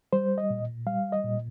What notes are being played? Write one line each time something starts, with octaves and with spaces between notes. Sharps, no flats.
G3 C5
D#5
A#2
G3 F5
D#5
A#2